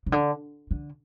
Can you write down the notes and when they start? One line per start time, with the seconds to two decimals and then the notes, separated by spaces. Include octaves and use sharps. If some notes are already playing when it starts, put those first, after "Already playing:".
0.06 C#3
0.12 D3
0.71 D3